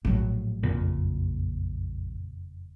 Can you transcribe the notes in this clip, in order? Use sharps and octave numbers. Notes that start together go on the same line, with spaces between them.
A#1 A2 F#3
F#1 F2 A#2